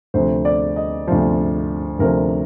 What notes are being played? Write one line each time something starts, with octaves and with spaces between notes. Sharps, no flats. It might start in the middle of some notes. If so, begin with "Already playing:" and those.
D2 C3 F3 C5
D5
D#5
D2 C3 F3 C5
D2 C3 F3 A#4